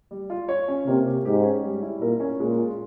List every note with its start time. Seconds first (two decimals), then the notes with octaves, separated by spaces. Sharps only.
0.11 G3
0.30 F4
0.49 C#5
0.68 C#4
0.86 C3 A#3
1.05 G4
1.25 G#2 G4
1.43 C#4
1.63 G3
1.82 E4
2.02 A#2 A#4
2.20 C#4
2.39 A#2 G#3
2.59 F4